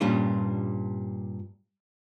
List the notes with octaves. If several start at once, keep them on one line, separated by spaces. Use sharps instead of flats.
G2 A#2 G3 C#4 D4 F4